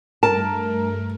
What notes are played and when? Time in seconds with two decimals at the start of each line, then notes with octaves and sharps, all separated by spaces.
0.23 G2 A3 A#4 A5